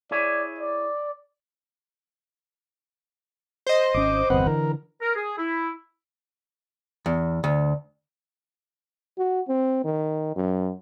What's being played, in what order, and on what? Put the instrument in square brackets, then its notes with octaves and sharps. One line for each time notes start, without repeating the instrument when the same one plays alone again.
[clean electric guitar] E4 G#4 C#5 [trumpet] D5
[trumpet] D5
[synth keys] C5 D#5
[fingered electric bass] G#1 C#4 [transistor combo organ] D6
[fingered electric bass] G1 E2 [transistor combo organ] C4 B4 F#5
[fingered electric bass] D3 E3 [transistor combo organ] A#4
[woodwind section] A#4
G#4
E4
[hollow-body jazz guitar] E2
D2
[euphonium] F#4
C4
D#3
F#2